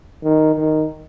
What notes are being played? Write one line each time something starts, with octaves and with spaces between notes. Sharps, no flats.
D#3
D#3